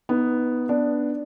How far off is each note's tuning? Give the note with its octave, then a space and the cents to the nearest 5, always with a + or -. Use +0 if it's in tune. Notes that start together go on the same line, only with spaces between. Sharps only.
B3 +0 D#4 +15
B3 +0 D4 +0